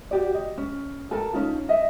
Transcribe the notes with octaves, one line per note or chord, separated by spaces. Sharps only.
F#4 G4 D5
D#5
C#4
A4 A#4 A5
C#4 D#4 F4
D#5 E5